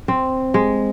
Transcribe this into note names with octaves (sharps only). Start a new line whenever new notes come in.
C4
G#3